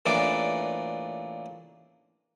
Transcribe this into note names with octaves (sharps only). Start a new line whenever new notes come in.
A1 A#2 E3 D4 D6